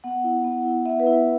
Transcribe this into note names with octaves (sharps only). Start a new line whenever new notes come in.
B3 F#5
E4
B3
E4
B3 E5
B4
E4
B4